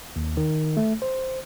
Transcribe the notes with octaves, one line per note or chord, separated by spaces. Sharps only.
D#2
D#3
A3
C5